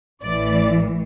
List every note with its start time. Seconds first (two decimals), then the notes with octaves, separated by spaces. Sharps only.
0.23 A1 A2 E3 D5